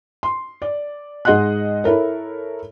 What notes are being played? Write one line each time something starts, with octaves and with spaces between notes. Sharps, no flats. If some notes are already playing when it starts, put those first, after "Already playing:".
C6
D5
G#2 G#4 D#5 F#5 C6 F#6
E4 A4 A#4 C#5